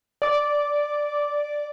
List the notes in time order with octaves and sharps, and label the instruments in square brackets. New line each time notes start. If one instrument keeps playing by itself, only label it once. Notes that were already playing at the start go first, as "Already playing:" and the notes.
[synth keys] D5 D6